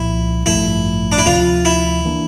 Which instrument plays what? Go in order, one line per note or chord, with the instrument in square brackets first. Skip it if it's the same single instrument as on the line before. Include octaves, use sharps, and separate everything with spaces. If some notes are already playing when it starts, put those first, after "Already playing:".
Already playing: [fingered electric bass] C2 A#2 F3 [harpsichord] E4
[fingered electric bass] A1 G2 F3 A3 [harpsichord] E4
[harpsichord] D4
E4
[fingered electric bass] D2 C3 F3 [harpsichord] F4
[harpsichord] E4
[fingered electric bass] E3 A#3 D4